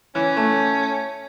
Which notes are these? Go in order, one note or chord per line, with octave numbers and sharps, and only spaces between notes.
E3 C#4
A3